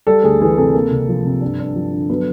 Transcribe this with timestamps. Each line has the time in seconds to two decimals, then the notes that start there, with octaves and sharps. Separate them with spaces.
0.07 G3 A4
0.23 D2 G#4
0.41 E3 G#4
0.58 C3 A4
0.74 A#3
0.91 C2
1.09 F3
1.25 C3
1.41 G2
1.59 G2
1.75 F3
1.93 D3
2.10 F#3 B3 B4